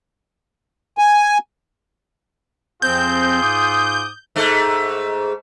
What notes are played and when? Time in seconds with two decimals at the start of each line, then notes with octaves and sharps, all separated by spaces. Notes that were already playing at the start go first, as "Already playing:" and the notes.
0.98 G#5
2.82 F2 F3 C4 F4 G#4 G6
3.41 G#2 D6 D#6
4.36 G#2 A3